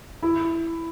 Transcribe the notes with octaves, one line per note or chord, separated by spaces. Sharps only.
E4